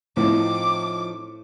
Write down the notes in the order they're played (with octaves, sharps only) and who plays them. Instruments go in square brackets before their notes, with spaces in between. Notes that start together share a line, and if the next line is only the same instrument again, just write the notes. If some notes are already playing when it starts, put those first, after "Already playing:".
[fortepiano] A2 [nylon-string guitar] F3 C4 D#4 [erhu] D6